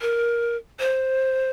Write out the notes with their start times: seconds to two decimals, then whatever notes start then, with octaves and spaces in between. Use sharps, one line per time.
0.01 A#4
0.80 C5